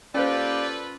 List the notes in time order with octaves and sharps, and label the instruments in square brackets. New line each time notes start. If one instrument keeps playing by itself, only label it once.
[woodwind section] A#3 G4 [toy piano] C#4 C5 [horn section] F4 A4 B4 [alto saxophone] D5